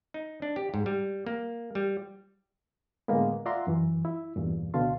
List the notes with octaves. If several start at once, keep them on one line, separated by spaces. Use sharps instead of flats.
D#4
D4
G4
G#2
G3
A#3
G3
A2 D3 G#3 A#3 B3
F4 D5 E5 F#5 A#5 C6
F#2 E3
E4
E2 G2 A#2
C#2 B2 D3 F5 A5 C6